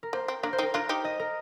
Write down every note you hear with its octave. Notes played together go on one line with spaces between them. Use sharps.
A#4
A#3 C5
C4
A#3 D4 A#4
C5
C4 D#4
A#4
D4 F4 A#4
D#4 G4
D#5
A#4